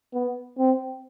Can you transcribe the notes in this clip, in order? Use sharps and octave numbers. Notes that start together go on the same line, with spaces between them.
B3
C4